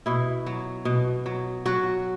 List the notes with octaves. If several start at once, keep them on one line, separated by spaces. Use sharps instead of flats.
B2 E4
F#3
B2
F#3
F#3 F#4